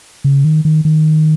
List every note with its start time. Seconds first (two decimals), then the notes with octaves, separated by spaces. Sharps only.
0.24 C#3
0.44 D#3
0.65 D#3
0.85 D#3